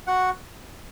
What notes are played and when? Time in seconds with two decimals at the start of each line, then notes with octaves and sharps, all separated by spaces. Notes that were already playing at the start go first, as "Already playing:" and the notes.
0.07 F#4 F#5